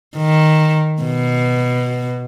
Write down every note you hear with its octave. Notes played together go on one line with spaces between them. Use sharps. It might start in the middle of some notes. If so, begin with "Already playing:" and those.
D#3
B2